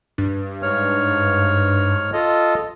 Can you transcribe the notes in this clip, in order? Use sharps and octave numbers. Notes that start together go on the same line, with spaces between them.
G2
G#2 C#5 F6
F4 A4 D#5